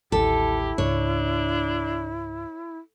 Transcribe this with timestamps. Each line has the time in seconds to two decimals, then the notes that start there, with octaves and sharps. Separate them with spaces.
0.12 A1 D#2 E4 G4 A4
0.78 C#2 G#2 D4 C#5